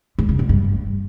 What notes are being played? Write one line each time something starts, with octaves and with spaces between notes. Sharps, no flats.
G#2
C#3
B2
G2